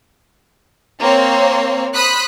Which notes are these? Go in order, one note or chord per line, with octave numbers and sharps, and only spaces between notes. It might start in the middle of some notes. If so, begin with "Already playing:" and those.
A#3 C4 C#5
C5 B5 D#6 F#6 B6